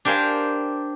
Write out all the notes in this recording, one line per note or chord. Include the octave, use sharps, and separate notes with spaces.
D4 G4 A#4 C5 F5 G#5